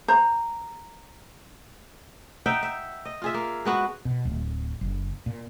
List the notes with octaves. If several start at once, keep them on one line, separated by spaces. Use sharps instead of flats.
C5 A#5
D#4 E5 F#5 G5
E5
D#5
F4 G#4 E5
A#3
G#3 B3 F#4
B2
D1
F#1
A#2